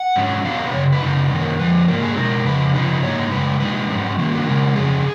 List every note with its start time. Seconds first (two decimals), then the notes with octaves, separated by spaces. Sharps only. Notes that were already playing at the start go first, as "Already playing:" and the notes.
Already playing: F#5
0.16 G#2 F#3 C#4
0.45 A#2 F#3 B3 F5
0.59 A#4
0.66 B4
0.73 F#2 C#3 C#5
0.93 B4
1.02 F#2 C#3 D#4
1.31 F#2 D#3 A#3 C#4
1.59 F2 F3 B4
1.88 G#2 F#3 A#3 A#4
2.03 G#4
2.17 B2 G#3 D#4 A#4
2.45 F2 C#3 B4
2.74 C#3 F3 G#3 B3 D#4 B4
3.03 G#2 F#3 A#3 D#4 C#5
3.31 F#2 C#3 G#3 B4
3.60 A#2 G#3 D#4 B4
3.90 G#2 F#3 C#4
4.18 D#3 A#3 C#4
4.33 F#4
4.46 C#3 G#3 C#4 A#4
4.75 F2 C#3 F#3 C#4 G#4